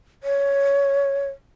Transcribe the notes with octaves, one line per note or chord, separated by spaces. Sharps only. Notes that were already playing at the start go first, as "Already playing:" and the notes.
C#5